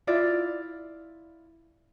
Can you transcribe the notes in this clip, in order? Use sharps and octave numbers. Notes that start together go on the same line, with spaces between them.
E4 F4 D5